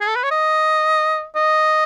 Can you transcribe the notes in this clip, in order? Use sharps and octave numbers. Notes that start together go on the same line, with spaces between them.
G#4
A4
B4
C#5
D#5
D#5